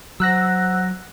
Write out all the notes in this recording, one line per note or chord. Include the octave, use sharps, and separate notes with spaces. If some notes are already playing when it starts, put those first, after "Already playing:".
F#3 C5 F#5 A#5 E6 F#6 A#6